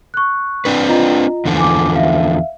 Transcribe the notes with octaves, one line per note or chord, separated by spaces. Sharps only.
C#6 F#6
C4 D4 B4
F4 D#5 A#5
E2 D3 F3
G#5 D6
E5 F5